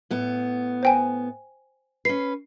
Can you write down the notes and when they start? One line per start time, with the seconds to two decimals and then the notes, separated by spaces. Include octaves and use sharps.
0.11 A2 B3
0.83 C5 G5 G#5
2.05 C#4 B4 C7